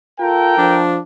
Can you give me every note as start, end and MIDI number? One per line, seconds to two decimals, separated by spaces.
0.20 0.56 65
0.20 0.81 69
0.20 0.81 70
0.20 0.81 79
0.58 0.99 53
0.58 0.99 62